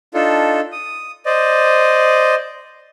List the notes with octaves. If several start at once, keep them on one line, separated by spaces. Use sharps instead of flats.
D4 D#4 F4 A4
D#6
C5 D5 D#5